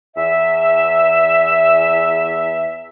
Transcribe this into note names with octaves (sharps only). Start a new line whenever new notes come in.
E2 E5